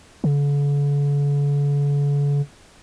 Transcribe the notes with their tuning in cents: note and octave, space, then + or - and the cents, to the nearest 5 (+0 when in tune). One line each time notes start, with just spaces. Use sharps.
D3 -45